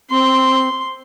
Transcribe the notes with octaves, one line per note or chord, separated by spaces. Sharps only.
C4 C6